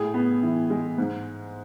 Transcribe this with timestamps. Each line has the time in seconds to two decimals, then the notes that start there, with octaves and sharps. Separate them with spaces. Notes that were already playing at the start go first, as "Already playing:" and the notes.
Already playing: A2 G#4
0.14 B3
0.43 E3
0.70 G#3
0.98 G#2